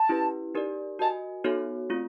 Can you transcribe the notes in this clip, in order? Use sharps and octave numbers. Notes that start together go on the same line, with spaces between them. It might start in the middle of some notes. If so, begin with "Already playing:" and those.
Already playing: A5
C#4 E4 G4 B4
D#4 G4 A#4 D5
F#4 A#4 D#5 G#5 A5
B3 D#4 F#4 A4 C#5
A3 C4 F4